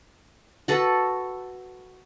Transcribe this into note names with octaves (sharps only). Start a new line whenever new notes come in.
F#4 A4 B4